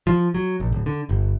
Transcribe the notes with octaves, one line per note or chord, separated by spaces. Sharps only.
F3
F#3
A#1
D1
D3
G1